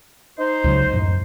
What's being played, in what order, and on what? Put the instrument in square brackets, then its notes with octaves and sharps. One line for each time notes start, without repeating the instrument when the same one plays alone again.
[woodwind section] D#4 C5
[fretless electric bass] C#2 C#3 F#3
F#2 A2 F3